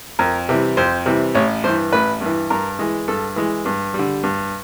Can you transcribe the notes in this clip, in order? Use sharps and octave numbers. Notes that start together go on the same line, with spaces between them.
F2 A#4
C3 E3 G3
F2 C5
C3 E3 G3
A1 C#5
G2 E3 C5
A1 B4
G2
E3
G2 A#4
E3 G#3
G2 A4
E3 G#3
G2
G3
D3
G2